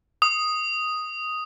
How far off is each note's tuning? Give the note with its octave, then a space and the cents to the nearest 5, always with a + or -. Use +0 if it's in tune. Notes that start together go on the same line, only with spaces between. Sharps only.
D#6 +0